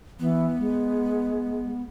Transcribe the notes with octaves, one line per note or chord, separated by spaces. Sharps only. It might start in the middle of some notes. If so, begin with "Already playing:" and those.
E3 B3
G#3